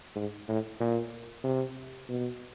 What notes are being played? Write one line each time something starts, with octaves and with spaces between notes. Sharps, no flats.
G#2
A2
A#2
C3
B2